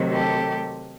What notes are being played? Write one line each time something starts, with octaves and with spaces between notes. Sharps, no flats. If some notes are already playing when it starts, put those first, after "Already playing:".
Already playing: C3 D#3 F#3 A3
G4 A4